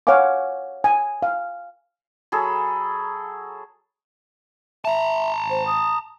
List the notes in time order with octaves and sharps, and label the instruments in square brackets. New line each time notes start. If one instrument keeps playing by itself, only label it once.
[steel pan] C#5 F5 F#5 G#5 D6
G#5
F5
[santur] F#3 G#4 A4 B5
[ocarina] E5 [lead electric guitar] A5 A#5
[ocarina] C5
D#6